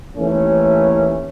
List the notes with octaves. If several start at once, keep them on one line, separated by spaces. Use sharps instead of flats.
D#2 E3 A3 C#4